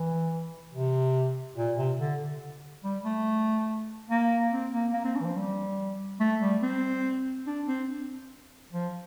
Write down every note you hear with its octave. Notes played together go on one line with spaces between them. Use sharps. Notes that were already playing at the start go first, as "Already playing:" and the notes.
Already playing: E3
C3
A#2
C3
D3
G3
A3
A#3
C4
A#3
A#3
C4
D4
E3
F3
G3
A3
G3
C4
D4
C4
F3